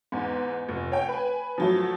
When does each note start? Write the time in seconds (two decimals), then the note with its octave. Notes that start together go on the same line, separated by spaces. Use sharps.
0.12 E2 G#2
0.69 F1
0.92 C#5 G5
1.09 B4 G#5
1.58 F3 F#3 A3